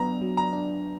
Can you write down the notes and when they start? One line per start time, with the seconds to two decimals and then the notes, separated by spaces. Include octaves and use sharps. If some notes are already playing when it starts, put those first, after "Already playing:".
Already playing: F#3 B3 D4 A#5
0.21 F#3
0.37 A#5
0.53 D4